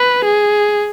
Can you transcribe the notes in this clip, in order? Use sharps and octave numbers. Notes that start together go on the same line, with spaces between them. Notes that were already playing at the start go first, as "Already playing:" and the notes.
Already playing: B4
G#4